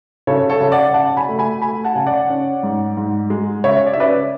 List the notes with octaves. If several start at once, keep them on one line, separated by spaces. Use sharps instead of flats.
C#3 A4 C#5
A4 C#5
C#3
D5 F#5
C#3 F#5 A5
G#5 B5
A3
G#5 B5
A3 G#5 B5
F#5 A5
C#3 G#5
D5 F#5
C#4
G#2
G#2
G#3
C#3 C#5 E5
D5
E5
C#4 B4 D5